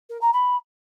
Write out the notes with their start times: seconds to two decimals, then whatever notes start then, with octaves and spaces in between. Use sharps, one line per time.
0.10 A#4
0.21 A#5
0.33 B5